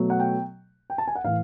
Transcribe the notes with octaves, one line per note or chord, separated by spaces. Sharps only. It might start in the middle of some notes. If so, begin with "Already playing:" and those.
Already playing: B2 F#3 A3
F#5
G5
G5
A5
G#5
F#5
A2 E3 F5